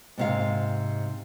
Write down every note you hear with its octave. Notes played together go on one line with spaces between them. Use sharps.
G#2 C3 F5